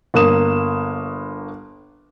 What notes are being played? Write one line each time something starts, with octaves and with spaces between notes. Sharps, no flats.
G1 A#3 D#6 E7